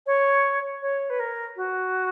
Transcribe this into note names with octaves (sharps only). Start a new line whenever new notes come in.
C#5
C#5
B4
A#4
F#4